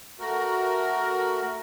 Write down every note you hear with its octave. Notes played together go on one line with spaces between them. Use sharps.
A3 F#4 A#4